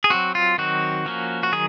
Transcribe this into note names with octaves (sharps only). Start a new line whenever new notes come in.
G#4
F#3 C4 F#4
F4
D#3 F#3 C4 F#4
F3 A#3 C#4
F#4
D#3 F#3 G#4